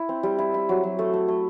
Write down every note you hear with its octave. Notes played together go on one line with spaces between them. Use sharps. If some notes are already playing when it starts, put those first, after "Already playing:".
Already playing: E4
C4
G3
E4
E4
F#3
F#3
A3 A4
A3
A3